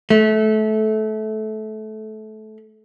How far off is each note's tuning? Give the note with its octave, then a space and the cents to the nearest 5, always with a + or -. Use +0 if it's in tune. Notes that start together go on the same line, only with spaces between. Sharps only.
A3 -20